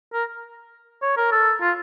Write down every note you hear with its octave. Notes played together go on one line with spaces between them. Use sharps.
A#4
C#5
A#4
A4
F4